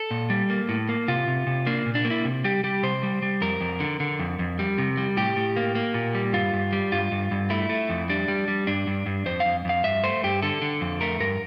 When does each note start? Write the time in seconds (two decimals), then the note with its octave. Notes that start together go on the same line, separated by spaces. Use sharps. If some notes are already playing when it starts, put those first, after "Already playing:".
Already playing: A4
0.11 A#2
0.30 G3
0.50 A#3
0.69 A2
0.89 A#3
1.08 C3 F4
1.28 C3
1.47 C3
1.67 A#3 D4
1.86 A#2
1.95 D4
2.05 A#3
2.10 E4
2.25 C3
2.44 G3 G4
2.64 G3 G4
2.83 C3 C5
3.03 G3
3.22 G3
3.41 F2 A#4
3.61 F2
3.80 D3
4.00 D3
4.19 F2
4.39 F2
4.59 G3
4.78 C3
4.97 G3
5.17 A2 G4
5.36 A2
5.56 A#3
5.75 A#3
5.94 A#2
6.15 G3
6.33 G2 F4
6.53 G2
6.72 G3
6.92 G2 F4
7.12 G2
7.31 G2
7.50 A3 E4
7.69 A3
7.90 F2
8.10 G3 D4
8.28 G3
8.48 G3
8.67 G2 D4
8.87 G2
9.06 G2
9.26 F2 C5
9.40 F5
9.45 F2
9.65 F2 F5
9.84 G2 E5
10.04 A3 C5
10.23 G2 G4
10.42 D3 A4
10.62 D3
10.81 F2
11.01 A3 A#4
11.20 G2 A#4